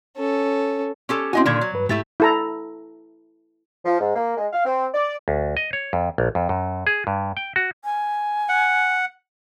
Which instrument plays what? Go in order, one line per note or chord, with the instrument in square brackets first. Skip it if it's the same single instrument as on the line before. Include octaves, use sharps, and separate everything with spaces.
[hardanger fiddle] C#4 A4
[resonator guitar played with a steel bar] C#4 G4 A4
[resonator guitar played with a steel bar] C4 D#5 G#5 [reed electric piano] C#4 E4 F#4
[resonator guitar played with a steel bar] A#2 D3 D#3 [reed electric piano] D5 G#6
[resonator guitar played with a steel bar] F#3
[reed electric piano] G2 B4
[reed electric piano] G#2 A6 [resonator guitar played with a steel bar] A3 E4 G4
[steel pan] E4 A4 A#5
[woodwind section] F3
G#2
A#3
G#3
F5
C4
D5
[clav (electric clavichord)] D2
D#5
C#5
F2
A#1
F2
F#2
G#4
G2
G5
F#4
[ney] G#5
[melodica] F#5